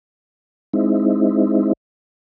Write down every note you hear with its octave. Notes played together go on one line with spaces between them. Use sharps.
G#3 C4 D#4 E4